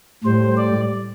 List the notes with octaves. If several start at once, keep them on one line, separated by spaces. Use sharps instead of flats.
A2 G3 C5
D5